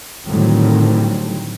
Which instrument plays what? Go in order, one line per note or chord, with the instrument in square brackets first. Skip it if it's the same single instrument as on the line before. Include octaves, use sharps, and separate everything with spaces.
[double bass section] A2 D3 D#3 F#3 G3 C4